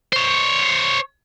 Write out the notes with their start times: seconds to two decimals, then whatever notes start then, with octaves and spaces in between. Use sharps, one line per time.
0.13 C5 C#5